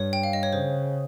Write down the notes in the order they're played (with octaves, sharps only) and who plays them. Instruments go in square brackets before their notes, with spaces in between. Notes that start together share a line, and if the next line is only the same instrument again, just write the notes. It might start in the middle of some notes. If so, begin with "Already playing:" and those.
Already playing: [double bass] G2 [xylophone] C#5
[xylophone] G5
F5
D#5
C#5
[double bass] C#3 [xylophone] C5